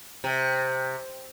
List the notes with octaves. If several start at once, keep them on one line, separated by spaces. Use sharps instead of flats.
C3